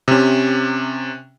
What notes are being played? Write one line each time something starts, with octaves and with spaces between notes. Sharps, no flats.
C3 C#4